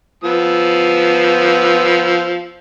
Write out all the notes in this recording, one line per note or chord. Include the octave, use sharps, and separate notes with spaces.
F3 B3 E6